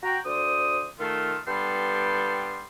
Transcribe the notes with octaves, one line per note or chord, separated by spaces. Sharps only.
F#4 G5 A#5
D2 C5 D5 D#6
D#3 A3 F4
G2 G3 B3 A4 G5 C6